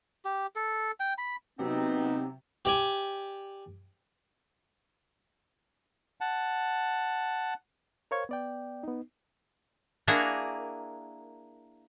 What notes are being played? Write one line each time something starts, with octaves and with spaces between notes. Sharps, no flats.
G4
A4
G5
B5
C3 F#3 B3 C4 D#4
G4 D5 G#5
F#5 A5
A#4 C5 C#5 F5 C#6 G#6
B3 D5 G5
B3 D#4
A#3 D4 E4 F#4 G#4 A#4